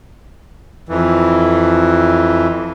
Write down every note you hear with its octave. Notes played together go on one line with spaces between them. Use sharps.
F2 E3